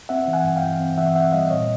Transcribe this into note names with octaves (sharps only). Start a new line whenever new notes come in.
C4 E5 F#5
E3
F#5 G#5
G2
F5 G5
E3
C4
E3 E5 F#5
C4 E5 F#5
G3 D#5 F5
A#2 C#5 D#5